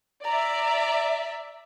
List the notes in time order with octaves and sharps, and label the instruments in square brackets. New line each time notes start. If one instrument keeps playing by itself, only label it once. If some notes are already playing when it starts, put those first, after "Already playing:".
[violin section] D5 E5 [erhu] A#5